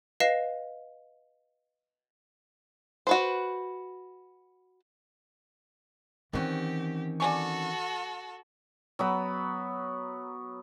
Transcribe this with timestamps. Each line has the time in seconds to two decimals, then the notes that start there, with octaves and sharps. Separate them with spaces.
0.20 B4 D#5 F5 A#6 C7 E7
3.07 F#4 B4 C5
6.33 D#3 E3 G3 C4 C#4 F#4 G4
7.20 F#4 A4 D5 G#5 C#6
8.99 F#3 B3 B5